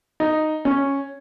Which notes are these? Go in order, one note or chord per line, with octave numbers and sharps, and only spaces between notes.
D#4
C#4